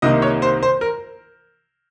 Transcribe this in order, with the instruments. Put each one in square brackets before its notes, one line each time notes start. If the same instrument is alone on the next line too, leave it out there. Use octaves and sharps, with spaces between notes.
[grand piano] C2 C3 D#3 A#3 D#5
C#5
C5
C5
A#4